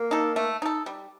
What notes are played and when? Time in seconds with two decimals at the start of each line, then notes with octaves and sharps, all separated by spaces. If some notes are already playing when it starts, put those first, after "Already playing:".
Already playing: A#3
0.11 D#4 A4
0.36 A3
0.62 D#4 A4
0.86 G3